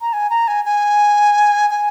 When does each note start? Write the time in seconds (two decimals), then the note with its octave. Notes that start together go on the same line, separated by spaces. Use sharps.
0.01 A#5
0.13 G#5
0.30 A#5
0.48 G#5
0.65 G#5
1.70 G#5